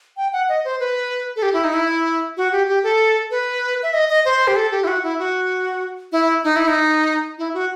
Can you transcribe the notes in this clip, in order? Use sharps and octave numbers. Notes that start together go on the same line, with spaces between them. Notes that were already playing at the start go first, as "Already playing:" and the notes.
G5
F#5
D#5
C5
B4
A4
G4
E4
D#4
E4
F#4
G4
G4
A4
B4
E5
D#5
D#5
C5
G4
A4
G4
E4
F#4
E4
F#4
E4
D#4
E4
D#4
E4
F#4